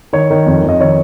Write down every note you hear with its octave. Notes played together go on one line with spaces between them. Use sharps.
D#3 C#5
D#3
F2
F2 D#5
D#3 C#5